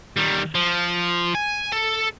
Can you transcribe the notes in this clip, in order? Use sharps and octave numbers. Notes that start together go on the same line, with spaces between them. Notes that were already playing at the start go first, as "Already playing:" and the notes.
D#3 G3
F3
G#5
A4